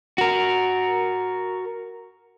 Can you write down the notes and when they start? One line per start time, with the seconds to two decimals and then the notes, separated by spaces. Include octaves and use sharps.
0.18 F#4 A#4